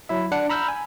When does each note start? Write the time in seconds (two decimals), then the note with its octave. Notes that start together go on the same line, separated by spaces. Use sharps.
0.09 F#3 E4 E5
0.32 D4 F#5 C#7
0.49 A#5 B5 E6 F6 G6
0.68 G#5